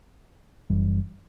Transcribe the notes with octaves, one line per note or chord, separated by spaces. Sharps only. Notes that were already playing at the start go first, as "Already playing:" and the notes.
F#1 F#2 E3 G3